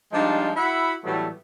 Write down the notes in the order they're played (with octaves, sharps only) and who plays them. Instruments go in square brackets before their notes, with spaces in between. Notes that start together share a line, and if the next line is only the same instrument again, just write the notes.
[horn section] F3 G3 G#3 D4 D#4 F4
E4 F#4 E5 F#5 B5
A2 E3 F#3 G3 A3 B3